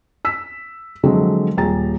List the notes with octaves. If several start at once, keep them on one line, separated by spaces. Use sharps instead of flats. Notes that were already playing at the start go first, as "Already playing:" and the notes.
E6 B6
D3 F3 F#3 G#3 A3 C4
D#1 G#4 G5 A#5 A6